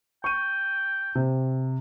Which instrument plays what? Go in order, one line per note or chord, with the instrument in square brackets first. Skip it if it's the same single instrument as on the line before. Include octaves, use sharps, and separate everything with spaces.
[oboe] G5 [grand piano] C#6 D#7
[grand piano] C3